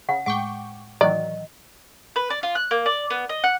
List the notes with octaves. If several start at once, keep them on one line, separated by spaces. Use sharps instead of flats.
C#3 F#5
A2 G#3 F#5 G5 C#6 D6 D7
A2 D#3 E3 F#3 D5 D#5
B4
D5
F4
F#6
A#3
D5
B3
D#5
F#5